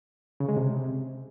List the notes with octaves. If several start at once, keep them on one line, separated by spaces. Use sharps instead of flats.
C#3
G#3
C3